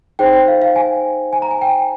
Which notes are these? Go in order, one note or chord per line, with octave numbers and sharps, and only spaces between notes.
D#4 G#4 C5 G5
G5
F5
F5
G#5
G#5
A#5
G#5
G5